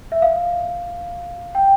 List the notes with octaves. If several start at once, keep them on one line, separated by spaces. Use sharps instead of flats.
E5
F5
G5